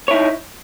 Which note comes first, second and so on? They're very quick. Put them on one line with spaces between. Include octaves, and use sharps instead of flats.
C#5 E4 D#4